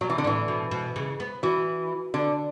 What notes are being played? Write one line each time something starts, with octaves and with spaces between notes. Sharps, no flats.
B2 F#3
E3
D3
A2 E3
B2
B2
C#3
B3
E3 F#4
D3